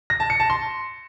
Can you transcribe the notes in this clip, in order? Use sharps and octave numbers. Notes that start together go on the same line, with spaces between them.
A#6
A5
C#7
A5
C6